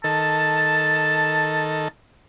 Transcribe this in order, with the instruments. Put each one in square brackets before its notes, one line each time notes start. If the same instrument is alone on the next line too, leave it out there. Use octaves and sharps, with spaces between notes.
[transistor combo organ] D#3 A4 [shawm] A5